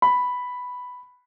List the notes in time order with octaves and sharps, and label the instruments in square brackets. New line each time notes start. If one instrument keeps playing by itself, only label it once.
[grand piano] B5